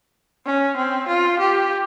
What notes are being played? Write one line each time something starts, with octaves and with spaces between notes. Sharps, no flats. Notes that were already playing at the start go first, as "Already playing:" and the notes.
C#4
C4
F4
G4